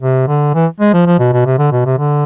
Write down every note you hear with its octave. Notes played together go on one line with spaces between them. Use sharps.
C3
D3
E3
G#3
F3
F3
B2
B2
C3
D3
B2
C3
D3